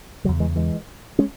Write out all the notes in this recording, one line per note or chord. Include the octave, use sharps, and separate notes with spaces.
E2 C#3 F#3
E3 G#3
E3 G#3
G#3 C#4